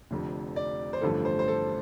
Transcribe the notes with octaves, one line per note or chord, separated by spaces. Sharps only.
F1 F2 D3
D5
C5
A1 G2 D3 F3 A3 A4
C5
C5
A4